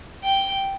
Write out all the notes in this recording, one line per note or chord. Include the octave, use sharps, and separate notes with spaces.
G5